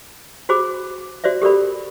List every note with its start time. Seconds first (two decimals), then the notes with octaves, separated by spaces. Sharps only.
0.49 F#4 G#4 C5 B5 D6
1.24 F#4 C5 D5 E5
1.42 G4 A4 A#4 D5 B5